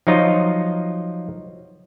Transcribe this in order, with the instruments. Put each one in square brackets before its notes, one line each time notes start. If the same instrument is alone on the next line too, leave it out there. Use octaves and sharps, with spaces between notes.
[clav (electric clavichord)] F3 F#3 D#4 F4